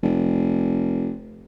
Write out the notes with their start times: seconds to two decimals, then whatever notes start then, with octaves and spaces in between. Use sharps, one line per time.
0.03 F1